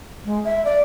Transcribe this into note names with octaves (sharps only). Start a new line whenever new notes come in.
G#3
E5
D5